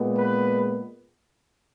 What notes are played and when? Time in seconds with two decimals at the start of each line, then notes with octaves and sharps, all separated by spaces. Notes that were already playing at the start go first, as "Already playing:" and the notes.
Already playing: A#2 G#3 B3
0.17 B4